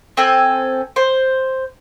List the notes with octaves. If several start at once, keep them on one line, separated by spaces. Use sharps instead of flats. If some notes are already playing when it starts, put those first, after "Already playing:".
C4 A4 G#5
C5